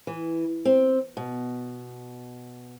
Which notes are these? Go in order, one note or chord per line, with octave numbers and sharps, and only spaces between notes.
E3
C4
B2